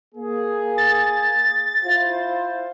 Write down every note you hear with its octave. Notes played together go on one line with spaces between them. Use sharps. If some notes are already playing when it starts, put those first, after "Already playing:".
A#3 G#4
A6
E4 F4 C5